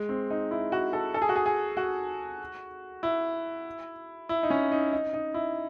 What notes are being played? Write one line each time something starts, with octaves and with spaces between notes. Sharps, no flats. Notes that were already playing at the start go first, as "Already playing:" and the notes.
Already playing: G#3
C4
D#4
E4
F#4
A4
A4
G#4
F#4
G#4
G#4
F#4
E4
E4
D#4
C#4
D#4
D#4
D#4
E4